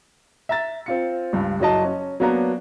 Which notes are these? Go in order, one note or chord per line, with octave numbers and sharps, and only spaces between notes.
E5 A#5 A6
C4 F4 C#7
C#2 G2
F#1 F#3 D#5 A5
C#4
F#3 A#3 B3 D4 A#5